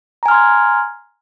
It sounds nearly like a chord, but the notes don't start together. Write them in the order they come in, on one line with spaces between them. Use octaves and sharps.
A#5 G#5 F6 C6 G#6